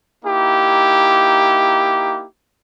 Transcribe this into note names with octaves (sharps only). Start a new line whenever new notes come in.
A#3 D#4 E4 G4